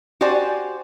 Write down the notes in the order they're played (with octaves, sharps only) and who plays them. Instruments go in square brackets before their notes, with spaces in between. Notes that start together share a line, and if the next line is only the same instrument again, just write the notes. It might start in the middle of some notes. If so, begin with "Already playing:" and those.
[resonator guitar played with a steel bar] F#4 G4 C5 D5 G#5